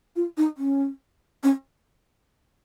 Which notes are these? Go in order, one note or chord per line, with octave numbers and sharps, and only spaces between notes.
F4
D#4
C#4
C#4